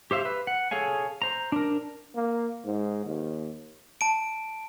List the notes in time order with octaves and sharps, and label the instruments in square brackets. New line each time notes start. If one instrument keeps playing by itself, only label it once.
[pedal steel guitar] G4 C5 E5 F5
B4
F#5
G#4 A4 C#5 F5 G#5
C5 A#5
D4 A#4
[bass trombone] A#3
G#2
D#2
[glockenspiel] A5 D7